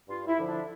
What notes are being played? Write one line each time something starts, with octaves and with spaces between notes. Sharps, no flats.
G2 F4
E4
D3 F3
D4